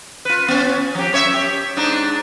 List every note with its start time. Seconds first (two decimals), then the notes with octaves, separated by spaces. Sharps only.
0.25 F4 B4
0.48 B3 C#4
0.95 F3 G4
1.13 F#2 C#5 E5
1.34 G4
1.76 G#2 D4 D#4